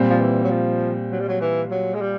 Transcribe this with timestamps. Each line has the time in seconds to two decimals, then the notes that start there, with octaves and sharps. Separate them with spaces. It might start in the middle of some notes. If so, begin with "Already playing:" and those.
Already playing: A#2 G3 C4
0.10 F3
0.20 E3
0.44 F#3
0.51 F3
1.11 F#3
1.20 G3
1.28 F#3
1.41 E3
1.71 F#3
1.94 G#3
2.01 G3